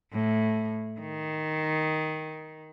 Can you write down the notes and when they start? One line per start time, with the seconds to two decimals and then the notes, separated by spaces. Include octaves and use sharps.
0.12 A2
1.00 D#3